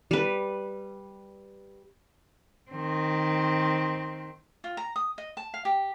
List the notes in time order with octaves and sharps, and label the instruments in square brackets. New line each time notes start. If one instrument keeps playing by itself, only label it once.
[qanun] G3 B4
[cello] D#3 C4
[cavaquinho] F4
A#5
D#6
D#5
A5
F5
G4